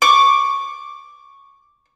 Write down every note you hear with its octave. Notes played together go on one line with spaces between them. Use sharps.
C#6 D6